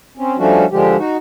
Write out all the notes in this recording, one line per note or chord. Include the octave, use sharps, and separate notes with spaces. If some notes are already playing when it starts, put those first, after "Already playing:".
C4 C#4
F3 G3 A3 C#4 D4 F#4
D3 F3 G#3 G4
D#4 F#4